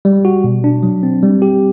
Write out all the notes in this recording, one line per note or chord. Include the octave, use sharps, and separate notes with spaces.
G3
F#4
B2
D4
F#3
C4
G3
G4